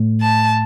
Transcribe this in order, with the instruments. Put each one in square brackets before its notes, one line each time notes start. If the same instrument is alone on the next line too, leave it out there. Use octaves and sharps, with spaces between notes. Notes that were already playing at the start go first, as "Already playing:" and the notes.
Already playing: [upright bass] A2
[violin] A5